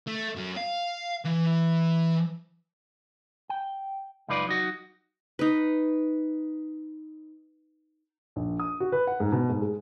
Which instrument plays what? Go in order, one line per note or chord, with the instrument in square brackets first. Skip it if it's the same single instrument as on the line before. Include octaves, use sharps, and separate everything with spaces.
[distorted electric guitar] A3
F#2 F#3
F5
E3
[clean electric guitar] G5
C#2 F#2 D#4 F4 B4 D5
F#3 D#4 F#4
[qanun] D#4 B4
[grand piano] A#1
D#6
F#4
B4
F#5
G#2
B2
G#2
G#3